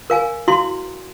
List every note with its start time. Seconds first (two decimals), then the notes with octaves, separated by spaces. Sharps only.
0.10 A#4 F5 G#5
0.48 E4 F#4 F5 C6